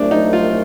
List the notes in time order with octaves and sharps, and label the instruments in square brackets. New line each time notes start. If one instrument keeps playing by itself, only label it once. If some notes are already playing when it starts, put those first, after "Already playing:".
Already playing: [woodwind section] C2 A#2 F#3 A3 [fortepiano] D4
[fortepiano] D#4
F4